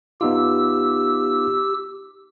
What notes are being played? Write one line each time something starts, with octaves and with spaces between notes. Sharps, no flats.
B3 D#4 F4 G4 E6